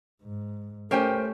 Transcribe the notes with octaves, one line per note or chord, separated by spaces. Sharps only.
G#2
A3 C#4 G4 A#4 C5 G5